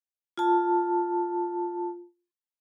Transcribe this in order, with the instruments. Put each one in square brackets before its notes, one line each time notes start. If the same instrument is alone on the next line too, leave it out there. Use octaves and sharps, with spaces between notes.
[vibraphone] F4 A5